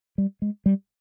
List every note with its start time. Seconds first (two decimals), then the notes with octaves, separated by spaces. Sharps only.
0.18 G3
0.42 G#3
0.66 G3